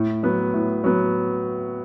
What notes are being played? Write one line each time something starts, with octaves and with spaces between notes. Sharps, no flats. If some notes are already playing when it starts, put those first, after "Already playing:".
Already playing: A2
F#3 B3
A2
F#3 B3